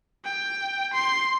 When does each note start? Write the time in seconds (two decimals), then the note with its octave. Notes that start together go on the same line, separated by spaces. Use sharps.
0.25 G5
0.93 C6